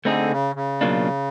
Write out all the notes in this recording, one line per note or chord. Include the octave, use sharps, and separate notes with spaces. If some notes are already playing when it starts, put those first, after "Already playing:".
D3 A3 C4 D#4 G#4
C#3
C#3
B2 F#3 A#3 D4 F4